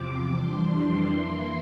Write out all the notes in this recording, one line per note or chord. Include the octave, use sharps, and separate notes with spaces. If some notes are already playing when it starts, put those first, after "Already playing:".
Already playing: E2 C3 F3 C4 D6
F2 E3 G3 D4 C6
E3 A#3 E4 C6